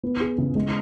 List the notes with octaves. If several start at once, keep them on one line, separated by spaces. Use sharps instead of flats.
B3
G#4
C#3
G#3